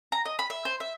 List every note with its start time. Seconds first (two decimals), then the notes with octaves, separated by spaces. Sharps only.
0.12 A#5
0.25 D#5
0.39 B5
0.50 E5
0.65 C5
0.80 E5